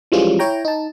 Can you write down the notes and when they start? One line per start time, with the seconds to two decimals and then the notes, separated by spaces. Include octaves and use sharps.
0.12 E3 F3 G3 G#3 C#4 F4
0.39 E4 C#5 G5 A#5
0.65 D#4 A5